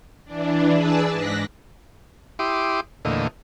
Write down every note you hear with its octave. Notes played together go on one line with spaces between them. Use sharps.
E3 D4
G#4 B4 D5 A5 E6
G#2 D4 F#6 A#6 B6
E4 G4 C6 D6 D#6
E2 A#2 D3 A3 D#5